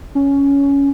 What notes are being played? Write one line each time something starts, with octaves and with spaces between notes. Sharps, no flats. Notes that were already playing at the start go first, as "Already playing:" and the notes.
C#4